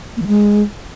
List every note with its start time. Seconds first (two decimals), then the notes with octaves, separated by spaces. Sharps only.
0.17 A#3
0.22 E3
0.27 G#3